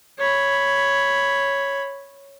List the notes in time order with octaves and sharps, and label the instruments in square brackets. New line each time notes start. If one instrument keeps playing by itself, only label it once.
[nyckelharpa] C#5 B5